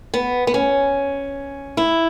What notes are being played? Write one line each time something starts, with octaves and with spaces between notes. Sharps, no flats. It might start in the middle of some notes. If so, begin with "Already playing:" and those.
B3
B3
C#4
E4